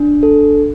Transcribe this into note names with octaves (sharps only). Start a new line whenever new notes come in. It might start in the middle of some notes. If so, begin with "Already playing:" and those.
Already playing: D4
A4